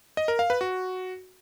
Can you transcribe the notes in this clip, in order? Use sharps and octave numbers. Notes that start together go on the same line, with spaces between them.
D#5
A#4
F5
B4
F#4